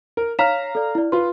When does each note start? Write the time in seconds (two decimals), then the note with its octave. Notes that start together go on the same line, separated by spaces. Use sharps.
0.17 A#4
0.39 C#5 F5 A#5 F6 B6 E7
0.75 A4 D5
0.95 E4 D5
1.12 F4 B4 C6